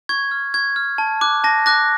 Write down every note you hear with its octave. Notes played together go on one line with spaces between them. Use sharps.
C#6 G#6
F6
C#6 G#6
F6
A5
D6 F#6
A5 A#6
D6 F#6 A#6